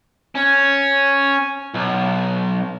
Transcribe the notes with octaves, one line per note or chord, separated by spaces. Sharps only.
C#4
B1